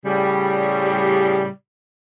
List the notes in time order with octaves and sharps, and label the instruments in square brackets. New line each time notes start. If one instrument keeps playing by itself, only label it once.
[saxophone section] A2 C#3 G3